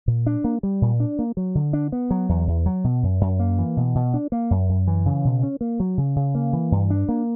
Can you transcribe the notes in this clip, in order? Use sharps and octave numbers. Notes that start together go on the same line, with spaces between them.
A#2
D4
A#3
G3
A#2
D4
A#3
F#3
D3
D4
B3
F#3
E2
E2
F#3
B2
F#2
F#2
A#3
E3
B2
B2
D4
A#3
F#2
F#2
E3
C#3
B2
C#4
A#3
F#3
C#3
C#3
A#3
E3
G2
D4
A#3